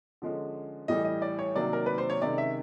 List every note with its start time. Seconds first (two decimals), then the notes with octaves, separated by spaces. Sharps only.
0.22 D3 F3 G#3 C#4
0.88 A2 E3 G3 D#5
1.05 D#5
1.22 D5
1.39 C#5
1.55 C3 D#3 F#3 A#3 D5
1.73 A#4
1.86 B4
1.98 C5
2.10 C#5
2.22 C3 D#3 G#3 C#4 D5
2.38 E5